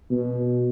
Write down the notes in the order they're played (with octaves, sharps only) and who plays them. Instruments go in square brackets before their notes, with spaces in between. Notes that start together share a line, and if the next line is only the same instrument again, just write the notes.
[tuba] B2